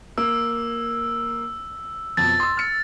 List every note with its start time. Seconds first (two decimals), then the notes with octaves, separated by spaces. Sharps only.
0.18 A#3 E6
2.17 F2 B2 A6
2.40 C6 E6
2.57 F6 C#7